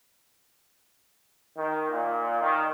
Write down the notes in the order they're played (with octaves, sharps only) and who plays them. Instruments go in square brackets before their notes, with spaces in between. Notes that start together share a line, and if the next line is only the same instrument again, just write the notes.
[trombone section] D#3
A#2
D#3